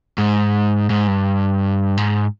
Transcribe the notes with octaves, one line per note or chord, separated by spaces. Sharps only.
G#2
G#2
G2
G#2